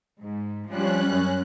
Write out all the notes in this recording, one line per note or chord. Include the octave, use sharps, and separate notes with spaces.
G#2
F3 G3 C#4 F#6
F#2